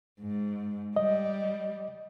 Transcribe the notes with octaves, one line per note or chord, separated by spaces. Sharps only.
G#2
G3 D#5